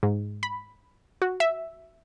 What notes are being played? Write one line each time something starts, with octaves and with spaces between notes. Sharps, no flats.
G#2
B5
F#4
E5